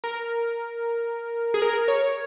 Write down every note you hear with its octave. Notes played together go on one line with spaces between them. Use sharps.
A#4
G#4
A#4
C#5